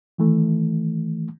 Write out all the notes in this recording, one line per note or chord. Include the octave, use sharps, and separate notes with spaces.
D#3 E3 A3